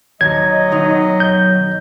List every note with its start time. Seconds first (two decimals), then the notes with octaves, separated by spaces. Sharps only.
0.21 D#2 F#3 D#5 G#6
0.72 B1 D#3 D#4
1.20 G6